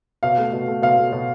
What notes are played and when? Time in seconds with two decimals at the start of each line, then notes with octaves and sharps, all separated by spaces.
0.23 B2 F5
0.38 A3
0.53 B2
0.68 A3
0.82 B2 F5
0.98 A3
1.12 B2